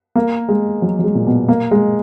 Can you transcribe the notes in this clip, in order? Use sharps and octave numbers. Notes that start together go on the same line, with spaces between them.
A#3
G#3
F#3
F#3
G#3
A#2
B2
A#3
G#3